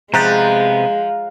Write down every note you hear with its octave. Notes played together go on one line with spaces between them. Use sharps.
C3 F3 G#3 B3 G4 A#5 F#6 A6